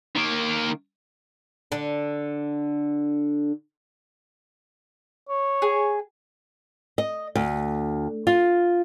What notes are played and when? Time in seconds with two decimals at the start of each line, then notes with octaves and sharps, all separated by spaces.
0.16 D#3 A#3
1.72 D3 D4
5.29 C#5
5.62 G#4
6.98 D#5
7.35 D2
8.27 F4